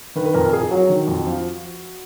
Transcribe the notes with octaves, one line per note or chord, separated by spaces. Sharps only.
D#3 B4
B4
F2 A#4
F2 G#4
F#3 F#4
D#3
F2
F3